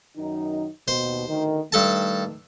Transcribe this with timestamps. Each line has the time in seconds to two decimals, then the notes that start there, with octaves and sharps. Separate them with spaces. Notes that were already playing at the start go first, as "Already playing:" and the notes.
0.17 F#2 D#3 D#4
0.88 D#2 B2 C5
1.29 D2 D#3
1.72 G2 D#3 A3 A4 A5